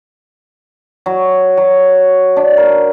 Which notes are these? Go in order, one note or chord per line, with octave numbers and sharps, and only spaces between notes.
F#3
F#3
D4
A#4